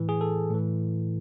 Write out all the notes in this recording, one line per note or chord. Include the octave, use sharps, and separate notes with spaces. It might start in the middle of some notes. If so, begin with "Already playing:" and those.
Already playing: A2 E3
G#4
A4
A2 E3